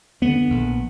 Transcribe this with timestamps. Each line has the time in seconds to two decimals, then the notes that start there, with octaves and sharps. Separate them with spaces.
0.21 F2 D3 B3
0.50 A#1